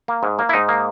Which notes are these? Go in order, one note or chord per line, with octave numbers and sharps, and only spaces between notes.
A#3
G#2
A#3
E4
G#2 D#4
A#3